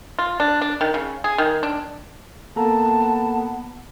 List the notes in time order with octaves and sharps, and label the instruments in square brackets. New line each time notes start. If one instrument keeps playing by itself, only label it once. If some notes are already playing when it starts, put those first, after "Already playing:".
[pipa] F4
D4
D4
D#3
C#3
G#4
D#3
D4
[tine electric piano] A#3 A4 A#5 [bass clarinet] B3 [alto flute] A5